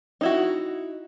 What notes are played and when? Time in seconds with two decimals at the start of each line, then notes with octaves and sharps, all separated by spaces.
0.21 D#4 E4 F#4